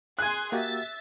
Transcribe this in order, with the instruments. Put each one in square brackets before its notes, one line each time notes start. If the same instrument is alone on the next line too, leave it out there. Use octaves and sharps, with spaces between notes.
[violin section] G#4 G#5 C6 [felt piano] F#6 G#6
[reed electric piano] A#3 F#4 G4 [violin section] E5 A6